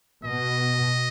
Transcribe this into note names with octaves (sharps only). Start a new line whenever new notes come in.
B2 D#5